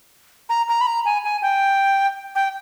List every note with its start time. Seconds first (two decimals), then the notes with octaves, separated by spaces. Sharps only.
0.49 A#5
0.69 A#5
0.81 B5
0.87 A#5
1.05 G#5
1.24 G#5
1.42 G5
2.35 G5